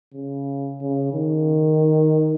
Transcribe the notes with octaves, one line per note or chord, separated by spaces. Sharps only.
C#3
C#3
D#3